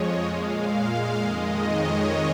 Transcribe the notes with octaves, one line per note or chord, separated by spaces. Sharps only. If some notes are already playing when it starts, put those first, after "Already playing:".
Already playing: F2 F3 G#3 C#5 D#5
A#2 G#3 F5
F5
F2 D#3 G#3 D#5
C#5